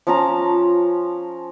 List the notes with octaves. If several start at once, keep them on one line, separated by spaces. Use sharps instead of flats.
F3 C#4 A5 A#5